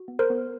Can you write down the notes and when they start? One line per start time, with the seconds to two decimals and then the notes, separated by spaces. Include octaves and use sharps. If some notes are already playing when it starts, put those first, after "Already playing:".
Already playing: F#4
0.08 B3
0.19 A#4 C5
0.30 B3